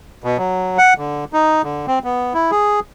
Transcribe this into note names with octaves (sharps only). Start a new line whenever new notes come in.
B2
F#3
F#5
D3
D#4
D3
C4
B3
E4
G#4